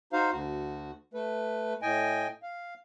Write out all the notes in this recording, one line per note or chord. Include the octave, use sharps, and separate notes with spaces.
D#4 F#4 C5 F5
D2 F#4
A3 B4
A2 D#5 G5 G#5
F5